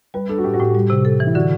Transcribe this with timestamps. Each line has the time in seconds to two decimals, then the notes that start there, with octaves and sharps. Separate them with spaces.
0.14 G3 B4
0.29 D4 A4
0.38 F#4
0.44 A2 G4
0.54 F#4
0.60 A2 G4
0.75 G3
0.90 C3
1.05 A4
1.20 E3
1.27 E4
1.35 D3 F#4